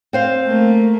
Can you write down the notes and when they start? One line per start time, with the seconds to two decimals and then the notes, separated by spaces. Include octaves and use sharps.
0.13 C4 C5 F5
0.45 A3 A#3